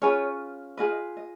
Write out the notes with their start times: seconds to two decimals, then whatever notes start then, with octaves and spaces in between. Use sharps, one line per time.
0.02 C#4 F4 G#4 B4 C#5
0.77 F4 G#4 B4 D#5
1.17 D#5